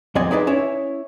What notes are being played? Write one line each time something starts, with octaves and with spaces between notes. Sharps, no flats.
F2 B3 C4 D5 D#5 G#5
D#4 E4 G#4 B4 D5 D#5
C#4 E4 C#5 E5